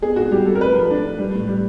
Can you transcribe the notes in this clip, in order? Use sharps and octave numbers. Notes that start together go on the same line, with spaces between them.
B3 G#4
G#2 F#4
G3 G4
G3 A4
A#4
A3 B4
F3
D4
D4
G3
A2
G3